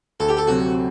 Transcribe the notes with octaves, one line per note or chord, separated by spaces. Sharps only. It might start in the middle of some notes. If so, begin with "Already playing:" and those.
D2 A4
G4
A4
C3 F#3 C4 F#4